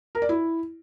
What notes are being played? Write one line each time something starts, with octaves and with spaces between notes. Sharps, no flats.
A#4
D5
E4